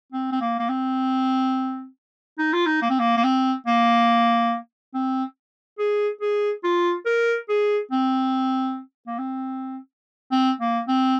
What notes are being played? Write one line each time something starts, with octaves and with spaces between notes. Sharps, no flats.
C4
C4
A#3
A#3
C4
D#4
F4
D#4
A#3
C4
A#3
A#3
C4
A#3
C4
G#4
G#4
F4
A#4
G#4
C4
A#3
C4
C4
A#3
C4